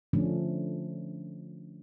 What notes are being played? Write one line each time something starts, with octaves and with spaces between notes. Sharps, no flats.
D3 F3 A3 C#4 D4